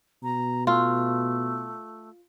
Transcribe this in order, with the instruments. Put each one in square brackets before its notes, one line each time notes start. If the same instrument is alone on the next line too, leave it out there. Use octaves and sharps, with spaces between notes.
[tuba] B2 [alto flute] A#5
[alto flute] A3 [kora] F4